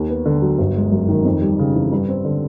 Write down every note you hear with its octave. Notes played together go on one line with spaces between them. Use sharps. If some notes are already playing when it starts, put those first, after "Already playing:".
Already playing: D#2
B3
D3
F#3
G1
G#3
F#2
D#3
F2
G3
C#3
E3
G2
C4
D3